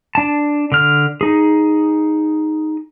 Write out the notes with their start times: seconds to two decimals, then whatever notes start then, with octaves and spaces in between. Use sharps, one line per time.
0.15 D4 A5
0.72 D3 F6
1.21 D#4 G#4